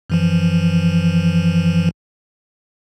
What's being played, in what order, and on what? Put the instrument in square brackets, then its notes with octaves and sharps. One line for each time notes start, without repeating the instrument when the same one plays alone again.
[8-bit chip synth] F#2 E3 F3